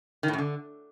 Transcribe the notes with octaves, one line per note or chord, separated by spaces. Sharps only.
D#3
A2
F#2
D3